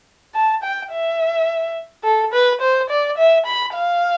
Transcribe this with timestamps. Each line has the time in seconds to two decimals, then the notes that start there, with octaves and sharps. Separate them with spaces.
0.35 A5
0.63 G5
0.92 E5
2.04 A4
2.33 B4
2.61 C5
2.90 D5
3.18 E5
3.46 B5
3.75 F5